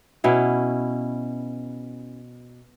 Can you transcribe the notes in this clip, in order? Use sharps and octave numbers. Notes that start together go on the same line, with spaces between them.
B2 C#4 E4